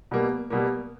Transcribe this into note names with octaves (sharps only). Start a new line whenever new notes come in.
B2 G3 A#3
B2 G3 A#3